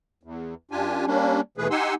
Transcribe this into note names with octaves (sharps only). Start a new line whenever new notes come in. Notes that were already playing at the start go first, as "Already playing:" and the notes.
E2
F#2 D4 F4 G4 G#5
G3 A#3 C#4 D4
D#2 B2 E3 A3 G#4 B4
D#4 G4 F#5 G#5 C6 E6